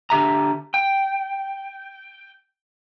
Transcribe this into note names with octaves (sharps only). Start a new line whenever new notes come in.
D3 G4 E5 A#5
G5